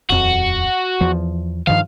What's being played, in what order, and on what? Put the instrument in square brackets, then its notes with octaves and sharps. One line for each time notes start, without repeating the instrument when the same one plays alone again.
[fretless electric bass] D#1 F2 [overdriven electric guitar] F#4
[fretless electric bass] E2 F3
[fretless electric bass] G2 D#3 F3 [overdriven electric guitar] F5